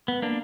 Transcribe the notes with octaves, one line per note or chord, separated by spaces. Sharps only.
B3
A#3 D4